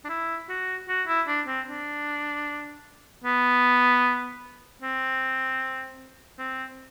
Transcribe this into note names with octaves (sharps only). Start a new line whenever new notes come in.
D4
E4
F#4
F#4
E4
D4
C4
D4
B3
C4
C4